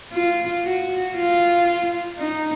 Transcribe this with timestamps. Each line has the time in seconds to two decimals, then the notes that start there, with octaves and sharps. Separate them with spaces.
0.13 F4
0.65 F#4
1.16 F4
2.18 D#4